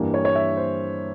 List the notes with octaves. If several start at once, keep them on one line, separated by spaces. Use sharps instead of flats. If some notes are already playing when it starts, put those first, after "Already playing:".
Already playing: G2 E3 G3 A#3
C#5
C#5
E5
C5